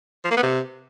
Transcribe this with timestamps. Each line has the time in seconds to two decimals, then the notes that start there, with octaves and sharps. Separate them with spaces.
0.24 F3
0.31 A#3
0.37 B3
0.43 C3